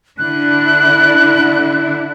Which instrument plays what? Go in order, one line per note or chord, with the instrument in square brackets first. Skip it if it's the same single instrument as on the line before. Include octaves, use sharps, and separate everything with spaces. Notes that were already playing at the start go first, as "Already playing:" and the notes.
[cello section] D3 D4 E4 [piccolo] F#6